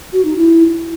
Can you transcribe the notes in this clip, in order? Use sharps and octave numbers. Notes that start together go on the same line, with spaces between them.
F#4
D#4
E4